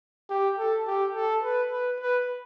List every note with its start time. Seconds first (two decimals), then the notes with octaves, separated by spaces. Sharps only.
0.30 G4
0.59 A4
0.87 G4
1.15 A4
1.43 B4
1.72 B4
2.00 B4